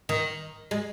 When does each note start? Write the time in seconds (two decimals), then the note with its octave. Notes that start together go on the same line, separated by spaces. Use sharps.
0.09 D#3
0.71 G#3